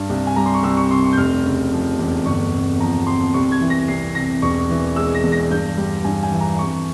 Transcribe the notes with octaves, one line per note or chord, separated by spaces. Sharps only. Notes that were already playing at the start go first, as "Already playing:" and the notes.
Already playing: G2
C2
G#5
G3 A#5
C6
C#6
C2 E6
C#6
C3 C6
C#6
G6
F1 F6
C#3
F3
E2
G1 C#6
C3
F3 A#5
F2 C6
C2 C#6
G#6
E3
A#6
C2 C7
C3 A#6
E1 C#6
E3
G#3 E6
A#6
E2
A#6
G2 G6
G3
G2 G#5
G#5
E3
A#5
F2 C#6